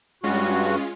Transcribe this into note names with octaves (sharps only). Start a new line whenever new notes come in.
G2 G#3 C#4 F4 F#4